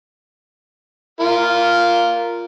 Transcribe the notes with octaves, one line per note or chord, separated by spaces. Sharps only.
F4 A#4